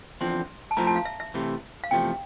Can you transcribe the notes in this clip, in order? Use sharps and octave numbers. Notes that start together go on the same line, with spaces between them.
E2 D3 F3 C4 C6
A5
F3 A3 C4 E4 A#4 A#5
A5
F5
E5
E5
C3 E3 A3
F5
E2 C3 F3 A3 G5